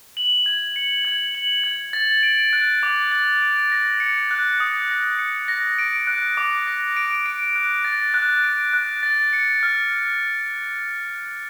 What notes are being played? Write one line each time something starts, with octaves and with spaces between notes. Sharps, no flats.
F#7
G#6
C#7
G#6
F#7
G#6
A6
D7
F#6
D6
A6
D7
A#6
C#7
F#6
D#6
A#6
C#7
A#6
D7
F#6
D6
A#6
D7
D7
F#6
A6
F#6
D7
F#6
A6
C#7
F6